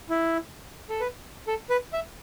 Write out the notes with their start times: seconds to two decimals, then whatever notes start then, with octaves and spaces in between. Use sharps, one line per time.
0.10 E4
0.89 A4
1.00 B4
1.47 A4
1.70 B4
1.93 E5